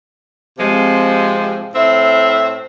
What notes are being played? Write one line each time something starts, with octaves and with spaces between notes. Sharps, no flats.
C3 F3 G#3 C4
A2 C4 E5